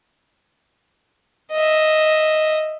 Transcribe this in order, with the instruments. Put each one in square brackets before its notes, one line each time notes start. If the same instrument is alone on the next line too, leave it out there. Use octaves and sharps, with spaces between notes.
[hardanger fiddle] D#5 E5